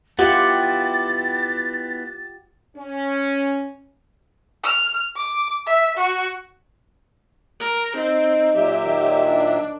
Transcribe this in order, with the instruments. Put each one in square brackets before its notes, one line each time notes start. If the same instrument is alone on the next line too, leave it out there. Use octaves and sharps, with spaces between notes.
[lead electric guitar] B3 E4 [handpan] F4 G4 F#5 [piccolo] A6
[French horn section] C#4
[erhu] F6
D6
E5
F#4
[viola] A#4
[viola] C4 [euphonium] D#4
[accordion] A#2 F#3 E5 [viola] G4
[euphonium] D#3
[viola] D4